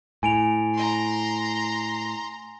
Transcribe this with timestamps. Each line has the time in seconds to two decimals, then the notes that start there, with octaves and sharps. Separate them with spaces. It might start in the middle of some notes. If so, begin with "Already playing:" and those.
0.23 A2 G#5 D7 F7
0.74 A#5 C6